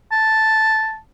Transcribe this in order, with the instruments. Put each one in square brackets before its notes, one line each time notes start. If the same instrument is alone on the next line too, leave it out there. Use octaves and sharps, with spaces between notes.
[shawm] A5